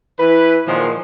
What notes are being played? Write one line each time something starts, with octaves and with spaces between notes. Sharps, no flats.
E3 E4 B4
A#2 D#3 F3 F#3 G#3